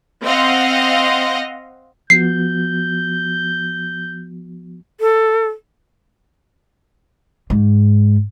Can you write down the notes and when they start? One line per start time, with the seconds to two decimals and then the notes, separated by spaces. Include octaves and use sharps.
0.24 C4 D#5 F5 F#5
2.10 F3 B3 F#4 G6 C7
5.01 A4
7.50 G#2